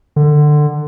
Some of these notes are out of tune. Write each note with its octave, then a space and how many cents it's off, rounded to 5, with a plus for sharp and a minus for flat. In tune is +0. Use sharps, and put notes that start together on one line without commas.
D3 +20